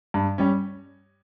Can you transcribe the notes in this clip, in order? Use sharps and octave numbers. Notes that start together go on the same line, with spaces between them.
G2
G3 C#4